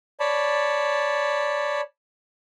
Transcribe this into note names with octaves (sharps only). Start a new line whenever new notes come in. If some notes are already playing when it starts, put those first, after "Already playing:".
C#5 D5 A5 B5